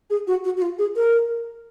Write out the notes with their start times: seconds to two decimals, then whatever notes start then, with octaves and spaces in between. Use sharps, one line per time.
0.10 G#4
0.27 F#4
0.44 F#4
0.57 F#4
0.62 F4
0.79 G#4
0.96 A#4